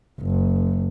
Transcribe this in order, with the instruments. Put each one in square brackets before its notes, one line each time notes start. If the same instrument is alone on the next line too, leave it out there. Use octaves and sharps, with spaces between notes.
[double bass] F#1